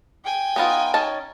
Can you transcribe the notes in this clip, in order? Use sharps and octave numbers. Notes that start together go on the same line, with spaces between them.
G5 G#5
B3 D#4 F4
C#4 D#4 A5